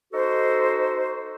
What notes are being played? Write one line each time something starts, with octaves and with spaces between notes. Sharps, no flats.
D#4 F#4 A4 C5